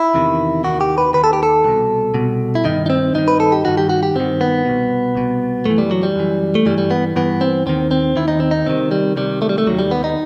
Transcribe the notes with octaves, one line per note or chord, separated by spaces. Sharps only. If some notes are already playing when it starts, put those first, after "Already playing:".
Already playing: E4
E2 C3 D#3
D#2 D#3 F#4
G4
B4
D#2 D#3 B4
A4
G4
A4
C2 B2
C2 B2
E4
G2 D#3 D#4
D#4
C4
G2 D#3 D#4
B4
A4
G4
G2 D#3 F#4
G4
F#4
G4
G2 D#3 C4
B3
C2 B2
C2 B2
F#2 E3 A3
G3
F#3
G3
F#2 E3
A3
G2 E3 G3
G3
B3
G2 E3 B3
C4
D#2 D#3 C4
C4
D#2 D#3 E4
D#4
C4
D#4
C2 C3 D#3 C4
G3
C2 C3 D#3 G3
A3
G3
A3
D#2 D#3 F#3
G3
B3
D#4